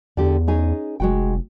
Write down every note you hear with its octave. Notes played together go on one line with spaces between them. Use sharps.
E2 D3 G4
C#4 D#4 G#4
F1 G#3 F#4 G5